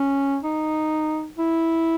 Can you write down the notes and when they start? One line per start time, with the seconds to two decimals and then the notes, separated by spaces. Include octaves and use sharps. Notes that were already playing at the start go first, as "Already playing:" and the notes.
Already playing: C#4
0.43 D#4
1.38 E4